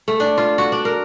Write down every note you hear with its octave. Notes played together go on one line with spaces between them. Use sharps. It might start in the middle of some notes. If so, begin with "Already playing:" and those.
A3
D4
F4
F#4
D4
A#4